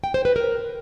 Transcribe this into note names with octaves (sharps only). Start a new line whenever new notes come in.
G5
C5
B4
A#4